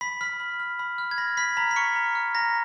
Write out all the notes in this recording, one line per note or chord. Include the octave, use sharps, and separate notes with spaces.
B5 B6
B5 F6 B6
B5
F6
B5
F6
G#6
B5 A#6
B5 F6 B6
A#5 B5 B6
B6
C#6 F6 C#7
A#5
F6
A#5 A#6